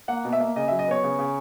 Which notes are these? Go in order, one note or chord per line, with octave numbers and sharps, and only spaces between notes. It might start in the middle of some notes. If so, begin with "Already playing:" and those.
A#3 F#5
B2
E5
A#3
C#3 D#5
F#3 E5
D#5
B3 C#5
C#3
C#3